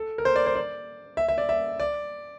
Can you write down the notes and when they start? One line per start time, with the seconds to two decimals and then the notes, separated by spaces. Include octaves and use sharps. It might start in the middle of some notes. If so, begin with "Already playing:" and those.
Already playing: A4
0.18 A#4
0.25 C5
0.36 D5
0.46 C5
0.55 D5
1.17 E5
1.28 E5
1.38 D5
1.49 E5
1.80 D5